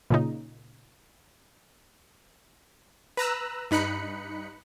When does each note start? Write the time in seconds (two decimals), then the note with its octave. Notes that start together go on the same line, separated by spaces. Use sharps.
0.10 A#2 C#3 D#4
3.17 B4 A#5 E6 F#6
3.71 G2 D#4 B5 F#6 C#7